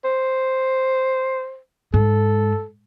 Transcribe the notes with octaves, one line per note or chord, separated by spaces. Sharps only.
C5
G#2 A4